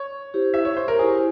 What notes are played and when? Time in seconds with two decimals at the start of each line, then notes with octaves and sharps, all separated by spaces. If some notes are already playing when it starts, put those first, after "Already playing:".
Already playing: C#5
0.34 E4 G4 C5
0.54 E5
0.65 C#5
0.77 C5
0.88 A#4
0.99 E4 G4 G#4 C5